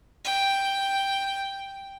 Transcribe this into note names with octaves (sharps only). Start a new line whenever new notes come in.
G5